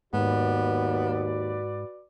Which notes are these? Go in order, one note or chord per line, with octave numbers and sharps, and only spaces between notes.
D#2 G#2 B3 F#4 B4 D5